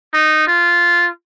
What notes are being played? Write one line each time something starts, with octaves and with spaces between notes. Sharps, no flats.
D#4
F4